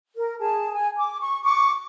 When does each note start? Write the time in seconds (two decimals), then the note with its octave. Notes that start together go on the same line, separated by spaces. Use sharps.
0.16 A#4
0.39 G#4 A5
0.74 G#5
0.97 D6
1.20 C#6
1.44 C#6 D6